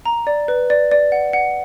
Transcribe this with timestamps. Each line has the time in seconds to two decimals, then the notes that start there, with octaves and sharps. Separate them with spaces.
0.05 A#5
0.27 D5
0.48 B4
0.70 D5
0.91 D5
1.12 F#5
1.33 F#5